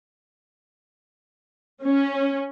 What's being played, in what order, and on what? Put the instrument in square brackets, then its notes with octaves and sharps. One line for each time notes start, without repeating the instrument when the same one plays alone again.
[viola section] C#4